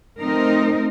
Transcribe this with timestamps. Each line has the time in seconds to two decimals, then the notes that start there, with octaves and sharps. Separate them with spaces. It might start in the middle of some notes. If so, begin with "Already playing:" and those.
0.19 A3 C4 D#4 A#4